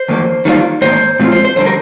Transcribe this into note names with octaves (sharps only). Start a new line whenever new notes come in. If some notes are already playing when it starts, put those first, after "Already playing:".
Already playing: C5
F2 D#3 A#3
D#3 G3 A#3 D4 F4
G#2 D#3 A#3 C5
A#2 F3 G#3 C4 F4
C5
C5
F2 D3 G3 C5
A#4